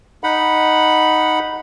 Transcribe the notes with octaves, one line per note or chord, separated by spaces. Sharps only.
D#4 F#5 B5